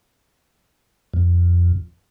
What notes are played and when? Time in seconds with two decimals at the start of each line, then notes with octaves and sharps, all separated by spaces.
1.14 F2